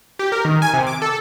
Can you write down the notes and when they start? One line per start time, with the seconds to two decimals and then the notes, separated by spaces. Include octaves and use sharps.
0.19 G4
0.32 A#4
0.45 D#3
0.62 G#5
0.74 C3
0.87 D6
1.02 A4